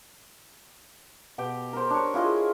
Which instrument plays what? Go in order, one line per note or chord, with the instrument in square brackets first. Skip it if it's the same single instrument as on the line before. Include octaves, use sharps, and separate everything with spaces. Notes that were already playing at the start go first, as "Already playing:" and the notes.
[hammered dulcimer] B2 G4 G5
A#4 C5
D4 C#5
E4 F4 G#4 D#5